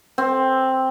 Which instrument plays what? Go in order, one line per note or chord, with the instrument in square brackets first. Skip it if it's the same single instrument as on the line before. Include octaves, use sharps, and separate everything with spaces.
[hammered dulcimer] C4